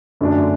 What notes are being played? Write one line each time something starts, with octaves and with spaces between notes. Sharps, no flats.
F#2 D3 A3 D4